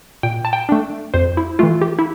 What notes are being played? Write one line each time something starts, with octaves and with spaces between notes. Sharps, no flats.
A#2 G5
A5
G5
A3 D4
F2 C5
E4
E3 A3 F4
G4
E4